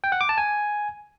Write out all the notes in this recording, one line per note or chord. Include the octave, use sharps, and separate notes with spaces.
G5
F#5
D6
A5
G#5